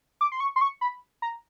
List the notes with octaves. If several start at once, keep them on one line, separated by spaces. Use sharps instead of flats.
D6
C6
C#6
C6
C#6
B5
A#5